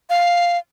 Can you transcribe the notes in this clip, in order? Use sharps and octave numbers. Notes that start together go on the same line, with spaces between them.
F5